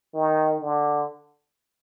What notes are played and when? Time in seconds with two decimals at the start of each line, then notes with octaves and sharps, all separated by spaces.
0.15 D#3
0.61 D3